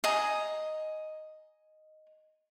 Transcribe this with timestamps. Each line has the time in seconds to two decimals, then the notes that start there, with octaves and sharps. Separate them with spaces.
0.04 D#5 G#5 A#5